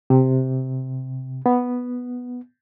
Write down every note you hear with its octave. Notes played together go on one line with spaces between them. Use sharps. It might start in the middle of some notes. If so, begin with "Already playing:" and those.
C3
B3